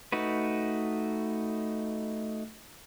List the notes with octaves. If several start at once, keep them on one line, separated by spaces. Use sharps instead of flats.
A3 D#4 F#4 B4